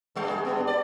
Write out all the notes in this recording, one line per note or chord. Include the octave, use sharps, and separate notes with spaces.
G2 G3
G#4
G2 B3
D5